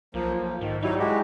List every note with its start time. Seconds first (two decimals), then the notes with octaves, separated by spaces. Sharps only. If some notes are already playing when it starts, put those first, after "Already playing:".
0.14 B1 F3 A#3
0.42 F3
0.61 G#2 D#3
0.83 F#3 G3 D#4 E4
0.99 G#3 F#4 G4